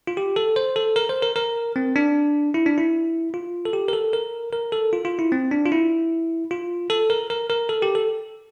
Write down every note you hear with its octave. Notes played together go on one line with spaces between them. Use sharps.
F4
G4
A4
C5
A4
A#4
C5
A#4
A#4
C4
D4
E4
D4
E4
F4
A4
G4
A#4
A4
A#4
A#4
A4
F4
F4
E4
C4
D4
F4
E4
F4
A4
A#4
A#4
A#4
A4
G4
A4